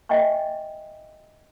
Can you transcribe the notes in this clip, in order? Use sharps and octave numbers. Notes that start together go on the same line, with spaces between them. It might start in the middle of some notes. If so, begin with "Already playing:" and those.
D#5 E5 G5 G#5 C#6